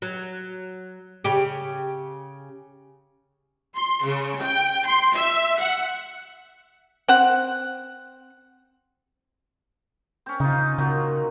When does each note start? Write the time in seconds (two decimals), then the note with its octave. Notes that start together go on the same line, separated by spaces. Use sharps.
0.02 F#3
1.24 C#3 G4
3.76 C6
4.05 C#3
4.40 G5
4.86 C6
5.15 E5
5.59 F#5
7.08 C4 F#5
10.26 C4 C#4
10.40 C#3 D#4 F4
10.78 A#2 C#3 F#3